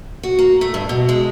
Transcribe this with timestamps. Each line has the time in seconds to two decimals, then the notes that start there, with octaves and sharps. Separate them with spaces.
0.23 F#4
0.39 A#3
0.61 A3
0.74 G2
0.89 B2
1.09 G#3